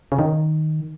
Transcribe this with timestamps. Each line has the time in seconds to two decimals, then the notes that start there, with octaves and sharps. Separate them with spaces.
0.12 C#3
0.19 D#3